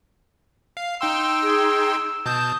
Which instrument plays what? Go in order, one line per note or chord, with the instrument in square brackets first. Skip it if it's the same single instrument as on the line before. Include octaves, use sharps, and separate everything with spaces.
[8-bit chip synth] F5
[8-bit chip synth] D#4 G5 C6 [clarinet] E6
[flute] G#4
[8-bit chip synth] B2 A5 G6 [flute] D#6